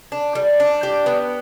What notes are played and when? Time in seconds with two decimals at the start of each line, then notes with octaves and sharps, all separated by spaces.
0.12 D4
0.35 G3
0.60 D4
0.83 G4
1.06 B3